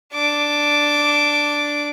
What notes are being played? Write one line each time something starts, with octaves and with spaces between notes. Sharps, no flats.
D4 D6